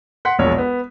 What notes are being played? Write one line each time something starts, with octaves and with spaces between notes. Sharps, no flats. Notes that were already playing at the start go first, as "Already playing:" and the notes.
F#5 C6 B6
E1 A#1 C#5
B3